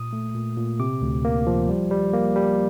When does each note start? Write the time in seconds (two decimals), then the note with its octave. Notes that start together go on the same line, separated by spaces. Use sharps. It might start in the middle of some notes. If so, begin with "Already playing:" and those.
Already playing: A#2 D#6
0.13 A3
0.35 A#2
0.57 A#2
0.79 C3 D6
1.02 D2
1.25 A#3
1.47 F3
1.69 G3
1.91 G3
2.13 A#3
2.36 G3